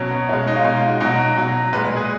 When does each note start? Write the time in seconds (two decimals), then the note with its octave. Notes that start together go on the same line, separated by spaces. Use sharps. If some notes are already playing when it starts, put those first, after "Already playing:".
Already playing: B2 F#3 C#4
0.11 B3
0.29 B2 G#3 C#4
0.47 D#4
0.56 F4
0.64 B2 G#3 D#4
0.77 F4
0.88 F#4
1.00 B2 F#3 D#4
1.37 B2 F#3
1.73 A#2 G#3 B4
1.85 B4
1.96 G#4